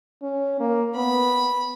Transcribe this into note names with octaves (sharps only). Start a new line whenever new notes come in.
C#4
A#3
B3 B5